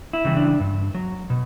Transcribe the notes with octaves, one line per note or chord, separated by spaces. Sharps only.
E4
C#3 E3 G3
D4
G2
F#3
B2